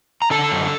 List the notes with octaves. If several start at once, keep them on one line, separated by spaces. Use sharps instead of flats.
A#5
D3 A4 A5
F#2